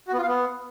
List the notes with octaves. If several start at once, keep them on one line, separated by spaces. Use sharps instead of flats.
F#4
B3
F4
F5
B3